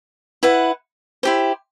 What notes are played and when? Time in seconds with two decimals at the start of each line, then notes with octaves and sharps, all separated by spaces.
0.43 E4 B4 F#5
1.23 E4 G4 C5